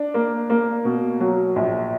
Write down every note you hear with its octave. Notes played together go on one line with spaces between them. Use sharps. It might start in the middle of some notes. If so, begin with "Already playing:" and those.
Already playing: D4
A#3
A#3
B2
F#3
A#1